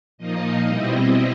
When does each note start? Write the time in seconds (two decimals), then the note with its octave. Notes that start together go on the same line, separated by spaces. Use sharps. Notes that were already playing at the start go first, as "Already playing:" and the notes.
0.18 A#2 F3 A#3 D#4 D#5
0.66 B2 G3 C4 E4